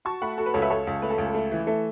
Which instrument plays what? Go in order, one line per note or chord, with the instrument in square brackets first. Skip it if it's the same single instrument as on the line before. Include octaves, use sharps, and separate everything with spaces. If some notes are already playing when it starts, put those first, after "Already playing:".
[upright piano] F#4 [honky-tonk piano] A5 C#6
[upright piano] A3 [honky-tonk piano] F#5 B5
[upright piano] F#4 [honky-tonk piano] A4
[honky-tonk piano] B4
[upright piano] C#2 [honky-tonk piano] A4 C#5
[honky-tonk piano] B4 E5
[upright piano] C#2 [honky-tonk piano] A4 C#5
[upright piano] C#2
[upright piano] A3 [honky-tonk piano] B4
[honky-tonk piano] A4
[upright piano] C#2
[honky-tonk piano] A4
[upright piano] A3
E3
A3